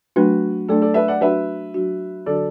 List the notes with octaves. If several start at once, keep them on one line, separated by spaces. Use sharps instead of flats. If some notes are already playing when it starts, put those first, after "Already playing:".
F#3 A3 D4 F#4 B4
F#3 A3 D4 A4 D5
A4 D5
B4 E5
D5 F#5
F#3 D4 F#4 B4 E5
F#3 D4 F#4
D3 F#3 D4 F#4 A4 D5